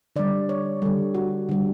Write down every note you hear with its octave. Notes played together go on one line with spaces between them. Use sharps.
D3 G3 D5
C#5
D3 G3 A4
F#4
D3 G3